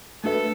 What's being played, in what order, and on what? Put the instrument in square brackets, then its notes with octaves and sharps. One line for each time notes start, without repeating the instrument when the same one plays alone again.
[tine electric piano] A3 D4 F#4 B4 E5 [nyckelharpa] A4